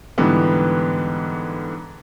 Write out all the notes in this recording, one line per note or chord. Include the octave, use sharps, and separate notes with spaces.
G#2 D3 E3 G3 B3